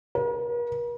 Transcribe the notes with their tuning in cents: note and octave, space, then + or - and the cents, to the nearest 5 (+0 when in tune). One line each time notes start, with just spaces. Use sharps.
A#4 +45